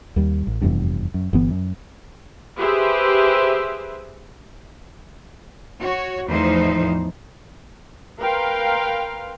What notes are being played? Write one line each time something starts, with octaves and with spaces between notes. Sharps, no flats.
D#2 G3
A1
F1 E2 G2
F#2
G1 E3 B3
F#2
G4 G#4 B4 C5 E5
F#4 C#5
E2 A2 F3 D#4 C5
A#4 B4 F5 G5 C6